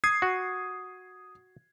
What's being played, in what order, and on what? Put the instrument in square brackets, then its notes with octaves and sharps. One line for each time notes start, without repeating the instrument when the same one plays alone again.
[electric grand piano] D#6 G#6 C7
[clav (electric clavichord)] F#4